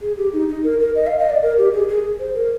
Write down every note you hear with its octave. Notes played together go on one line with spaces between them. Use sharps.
G#4
G4
D#4
D#4
A#4
A#4
D#5
F5
D#5
D5
A#4
G4
G#4
G#4
C5
A#4